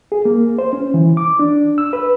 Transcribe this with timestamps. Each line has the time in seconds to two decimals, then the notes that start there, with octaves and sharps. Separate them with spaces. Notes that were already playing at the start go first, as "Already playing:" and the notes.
0.12 G#4
0.25 A#3
0.59 C5
0.73 C#4
0.94 E3
1.17 D6
1.39 D4
1.78 E6
1.93 B4